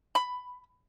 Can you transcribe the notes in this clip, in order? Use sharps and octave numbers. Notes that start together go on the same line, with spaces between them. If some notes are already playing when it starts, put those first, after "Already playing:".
B5